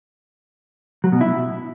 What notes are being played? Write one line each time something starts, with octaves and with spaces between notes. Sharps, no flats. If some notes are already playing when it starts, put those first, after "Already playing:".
F#3
B2
E4